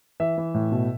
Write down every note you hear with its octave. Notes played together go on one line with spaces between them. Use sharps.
E3 E5
E3
A2
B2